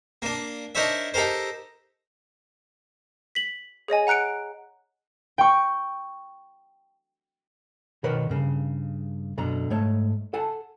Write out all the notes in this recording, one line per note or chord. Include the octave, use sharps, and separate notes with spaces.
A#3 D4
D4 D#4 A#4 C5 C#5 E5
D#4 G4 A4 A#4 C5
B6 F#7
G#4 C#5 D#5 G#5
F#5 A#5 F#6 C#7 D7
G5 C#6
B2 D#3 A#4 B4 C#5
G2 C#3
F#2 B2 D3 A#5
G#2 A3 C#5
A4 F#5 G#5 A5